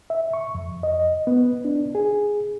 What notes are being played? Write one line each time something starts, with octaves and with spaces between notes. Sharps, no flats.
E5
C#6
F2
D#5
B3
D4
G#4